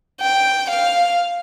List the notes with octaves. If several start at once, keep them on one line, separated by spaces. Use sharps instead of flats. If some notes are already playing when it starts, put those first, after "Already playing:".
G5
F5